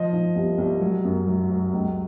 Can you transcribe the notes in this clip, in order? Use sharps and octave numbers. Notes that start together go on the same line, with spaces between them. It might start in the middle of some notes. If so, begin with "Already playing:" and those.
Already playing: F3 D#5
F3
C2
C2
F#3
F#2
F#3
F#3
C#2